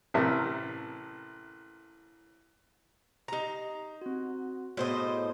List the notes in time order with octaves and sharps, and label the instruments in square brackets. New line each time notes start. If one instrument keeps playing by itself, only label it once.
[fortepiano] A1 A2 C3 A#4 E5
[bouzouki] D#4 A#5 [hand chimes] G4 A#6
[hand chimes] C4 F#4
[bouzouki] A2 C5 D#5 [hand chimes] B3 F#4 G#4